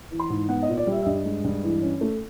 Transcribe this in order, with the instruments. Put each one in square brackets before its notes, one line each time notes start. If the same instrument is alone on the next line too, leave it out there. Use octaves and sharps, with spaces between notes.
[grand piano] E3
C6
G#2
B3 F#5
D#5
A#2
D5
G3 E5
E5
G2 D#5
G#3
G2
E3
C#4
A3